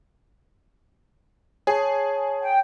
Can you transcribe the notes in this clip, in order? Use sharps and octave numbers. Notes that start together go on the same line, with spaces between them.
G#4 C#5 A5
G5